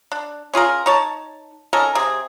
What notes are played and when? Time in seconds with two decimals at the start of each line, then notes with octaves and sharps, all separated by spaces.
0.12 D4
0.54 C#4 F4 G#4 A#4
0.86 D#4 C#5 A5
1.73 C#4 D#4 A4 A#4
1.95 C3 G#4